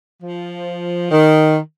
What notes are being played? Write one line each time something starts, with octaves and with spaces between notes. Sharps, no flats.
F3
D#3